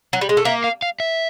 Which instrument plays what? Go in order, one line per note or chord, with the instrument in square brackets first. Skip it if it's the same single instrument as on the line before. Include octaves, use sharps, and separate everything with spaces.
[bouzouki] F#3
G3
G#3
A3
[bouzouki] A#3 [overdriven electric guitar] E5
[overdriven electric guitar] F5
F5
E5